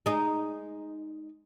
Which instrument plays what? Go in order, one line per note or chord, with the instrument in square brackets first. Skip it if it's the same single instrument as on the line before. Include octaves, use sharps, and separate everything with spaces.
[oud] G#3 D#4